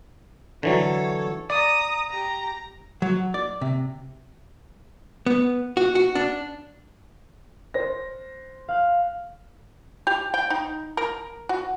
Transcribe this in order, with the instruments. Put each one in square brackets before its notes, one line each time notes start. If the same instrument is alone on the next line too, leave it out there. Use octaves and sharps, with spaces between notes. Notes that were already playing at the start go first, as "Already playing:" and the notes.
[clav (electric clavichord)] D3 E3 F#3 [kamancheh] A4 C#5
[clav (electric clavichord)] D5 [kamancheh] A#5 D#6
[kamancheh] G4 A#5
[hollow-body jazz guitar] F#3
D5
C3
B3
F#4
F#4
D4
[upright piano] C5 A#6
[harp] F5 F#6
[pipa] G4
G5
D#4
A#4
F#4